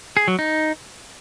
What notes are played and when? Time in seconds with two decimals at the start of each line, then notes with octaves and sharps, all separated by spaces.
0.17 G#4
0.28 F#3
0.39 D#4